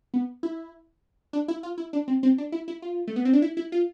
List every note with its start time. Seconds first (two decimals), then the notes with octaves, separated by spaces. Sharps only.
0.14 B3
0.43 E4
1.33 D4
1.48 E4
1.63 F4
1.78 E4
1.93 D4
2.08 C4
2.23 C4
2.38 D4
2.52 E4
2.68 E4
2.82 F4
3.07 A3
3.16 B3
3.25 C4
3.33 D4
3.42 E4
3.57 E4
3.72 F4